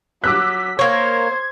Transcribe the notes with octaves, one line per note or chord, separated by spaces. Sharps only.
F#3 D6 E6 F#6 B6
A#3 C5 C#5 G#6